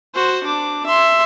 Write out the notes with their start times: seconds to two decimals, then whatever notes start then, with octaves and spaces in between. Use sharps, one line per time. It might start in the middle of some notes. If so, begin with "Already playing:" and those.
0.14 F#4 C5
0.44 D4 D6
0.86 E5 C6